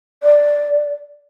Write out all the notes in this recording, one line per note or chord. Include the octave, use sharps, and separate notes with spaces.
D5